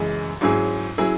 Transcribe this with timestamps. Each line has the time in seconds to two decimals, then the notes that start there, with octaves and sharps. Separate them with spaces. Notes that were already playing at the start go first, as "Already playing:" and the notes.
Already playing: F#2 C#3 E3 G#3
0.41 G#2 F#3 C#4 E4 G#4
0.98 F#3 C#4 E4 G#4